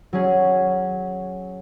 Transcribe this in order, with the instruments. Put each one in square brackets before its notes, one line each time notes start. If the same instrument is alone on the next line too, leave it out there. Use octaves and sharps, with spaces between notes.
[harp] F#3 C#4 G#4